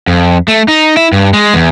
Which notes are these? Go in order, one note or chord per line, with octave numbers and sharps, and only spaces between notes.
F2
A3
D#4
E4
G2
G#3
E2